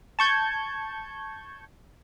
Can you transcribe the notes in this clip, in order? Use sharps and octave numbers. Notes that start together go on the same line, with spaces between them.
A5 C#6 G6 G#6